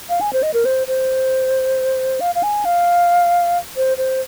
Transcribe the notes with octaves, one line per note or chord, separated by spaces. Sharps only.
F5
G#5
C5
D#5
A#4
C5
C5
F5
F5
G#5
F5
C5
C5